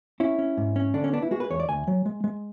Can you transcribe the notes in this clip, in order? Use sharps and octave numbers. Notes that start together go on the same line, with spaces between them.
C#4 E4
C#4
G#2
C#4
D3 D4
C#4
B3 D4
E4
G#3 F#4
B4
E2 C#5
D5
D2 G#5
F#3
G#3
G#3